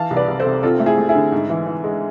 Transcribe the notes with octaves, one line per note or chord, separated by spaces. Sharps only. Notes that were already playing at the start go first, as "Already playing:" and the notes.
Already playing: E3 F5 A5
C2
B4 D5
C2
A4 C5
C3
C4 F4 A4
A3
E4 G#4
A3
E4 G#4
D3
G#2
E3
E3
G#3